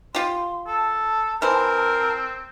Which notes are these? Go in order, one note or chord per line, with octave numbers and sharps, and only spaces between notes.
F4 G4 C6
A4 A5
E3 C4 A#4 C5